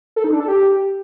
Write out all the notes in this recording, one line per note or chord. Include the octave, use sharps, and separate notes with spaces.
A4
D#4
D4
A4
G4